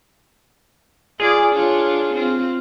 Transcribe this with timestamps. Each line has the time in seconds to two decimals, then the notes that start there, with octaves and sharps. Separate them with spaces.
1.20 F4 G#4 D5
1.53 D4 F4 C#5
2.14 C4 F4